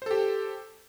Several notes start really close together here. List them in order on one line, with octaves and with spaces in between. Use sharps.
C5 A4 G4